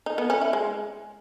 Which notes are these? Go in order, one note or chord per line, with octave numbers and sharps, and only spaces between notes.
D#4
B3
C#4
E4
G#3